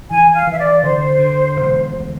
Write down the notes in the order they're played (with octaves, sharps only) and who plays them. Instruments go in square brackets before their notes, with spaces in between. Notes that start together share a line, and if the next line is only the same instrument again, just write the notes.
[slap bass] E3 [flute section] G#5
[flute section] F5
[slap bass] E3 [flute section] E5
[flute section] D5
[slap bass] D3 [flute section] C5
[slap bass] D3
E1
D2